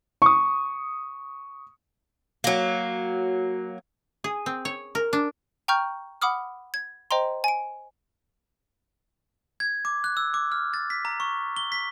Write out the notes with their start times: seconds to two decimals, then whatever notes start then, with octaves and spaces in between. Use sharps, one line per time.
0.22 C#6 D#6
2.44 F#3 A#3
4.24 G#4
4.46 C4
4.65 C#5
4.95 A#4
5.13 D4
5.68 G5 A#5 C#6 F6 G6
6.22 F#5 B5 D6 D#6 F6
6.74 G#6
7.11 C5 D#5 G5 A#5 C6
7.44 G#5 D7
9.60 G#6
9.85 D6
10.04 F#6
10.17 E6
10.34 D6
10.52 F6
10.74 A6
10.90 B6
11.05 A#5
11.20 C#6
11.56 G7
11.72 B6